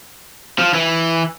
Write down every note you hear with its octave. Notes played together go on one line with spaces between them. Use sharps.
F3
E3